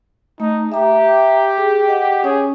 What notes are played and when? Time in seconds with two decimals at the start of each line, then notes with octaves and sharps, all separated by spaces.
0.40 A3 D#4
0.72 G4 E5 A#5
1.58 G#4
1.88 D#5 F#5
2.24 C#4 G#4 C#5